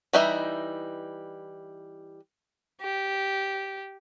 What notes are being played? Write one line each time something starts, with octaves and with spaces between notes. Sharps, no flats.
E3 G3 D#4 D#5 E5
G4